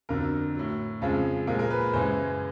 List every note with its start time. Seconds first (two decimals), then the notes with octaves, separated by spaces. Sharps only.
0.09 F2 D3 F#3 A#4
0.55 A2 F#3
1.01 F2 C#3 F3 G#3
1.47 A#2 F3 G#3 A#4
1.59 A#4
1.70 B4
1.93 F#2 C#3 E3 G#3 C5